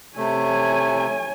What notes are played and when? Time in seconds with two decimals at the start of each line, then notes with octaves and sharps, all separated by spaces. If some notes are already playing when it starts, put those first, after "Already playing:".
0.17 C3 A3 C#5 G#5